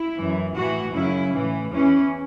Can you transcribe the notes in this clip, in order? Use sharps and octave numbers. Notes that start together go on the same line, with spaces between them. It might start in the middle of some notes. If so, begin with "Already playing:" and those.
Already playing: E4
F#2 E3
A2 E3 F#4
F#2 C#3 F#3 E4
A2 E3
E2 E3 C#4